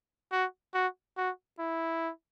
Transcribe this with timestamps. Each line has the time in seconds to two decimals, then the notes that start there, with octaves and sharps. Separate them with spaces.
0.32 F#4
0.74 F#4
1.17 F#4
1.59 E4